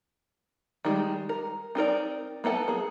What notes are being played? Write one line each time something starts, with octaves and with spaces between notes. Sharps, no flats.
D#3 G3 G#3
A#4
C4 D#4 A#4 D5
A#3 B3 A4 F#5 A5
A#3 G#4